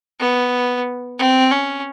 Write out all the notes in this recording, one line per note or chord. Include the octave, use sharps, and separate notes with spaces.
B3
C4
C#4